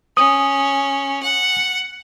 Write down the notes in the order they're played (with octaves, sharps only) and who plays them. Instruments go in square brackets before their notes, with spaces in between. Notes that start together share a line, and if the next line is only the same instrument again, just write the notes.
[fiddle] C#4 [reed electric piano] D#6
[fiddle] F#5